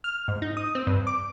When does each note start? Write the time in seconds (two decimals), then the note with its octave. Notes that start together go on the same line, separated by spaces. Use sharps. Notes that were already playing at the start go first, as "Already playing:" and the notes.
0.04 F6
0.28 G#2
0.42 D#4
0.57 D#6
0.75 C4
0.87 G2
1.07 D6